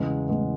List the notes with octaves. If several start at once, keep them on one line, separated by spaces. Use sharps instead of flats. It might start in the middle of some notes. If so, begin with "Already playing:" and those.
Already playing: E2 C#3 G#3 B3
C#3 G#3 B3